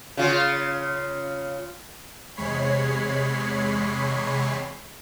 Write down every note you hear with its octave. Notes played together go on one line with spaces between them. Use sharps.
C#3 F4
E2 C3 G#3 C#5 B5 C7